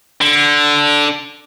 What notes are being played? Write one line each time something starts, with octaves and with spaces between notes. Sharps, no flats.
D3